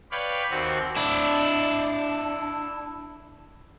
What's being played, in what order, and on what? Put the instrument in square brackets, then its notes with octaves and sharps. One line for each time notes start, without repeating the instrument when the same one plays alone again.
[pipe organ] B4 C#5 D5 F5 G5 B5
D#2 C4 F#4 F#6
[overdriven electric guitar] D4 E4